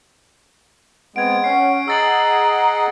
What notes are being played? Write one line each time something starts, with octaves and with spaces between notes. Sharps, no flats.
G#3 B3 C4 F#5 G#6 D7
C#4 F#5 C7
G#4 D#5 F#5 A#5 E6 A6 F#7